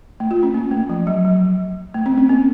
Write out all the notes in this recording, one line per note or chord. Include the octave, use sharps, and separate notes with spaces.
A3
F4
C#4
A#3
A3
F3
F#3
F#3
A3
C4
C#4
A#3